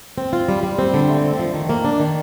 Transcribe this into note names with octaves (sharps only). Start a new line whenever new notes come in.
C4
F4
G3
G3
C4
D3
A3
C4
F3
D#3
A#3
D4
D#3